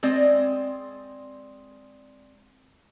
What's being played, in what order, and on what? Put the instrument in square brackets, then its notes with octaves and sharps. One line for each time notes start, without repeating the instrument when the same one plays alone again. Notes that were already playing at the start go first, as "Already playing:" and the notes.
[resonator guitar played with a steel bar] G#3 C4 D5 D#5